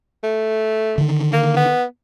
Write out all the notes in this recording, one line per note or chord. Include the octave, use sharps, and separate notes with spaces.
A3
D3 D#3
A#3
B3